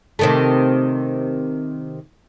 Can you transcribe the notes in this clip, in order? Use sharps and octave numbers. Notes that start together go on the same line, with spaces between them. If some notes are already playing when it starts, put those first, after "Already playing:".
C3 D#3 A3